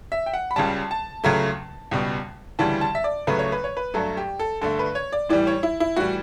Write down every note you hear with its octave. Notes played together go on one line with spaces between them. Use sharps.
E5
G5
F#5
B5
C#2 C#3 G3 A5
A5
C#2 C#3 F#3 A3
C#2 B2 G3
D2 C#3 E3 G3 A5
A5
E5
D5
C#2 C#3 F#3 A3 B4
C#5
B4
C#5
B4
G2 F#3 A3 A4
G4
A4
G2 D3 A3 A4
B4
C#5
D5
A2 E3 G3 D5
C#5
E4
E4
A2 E3 G3 F#4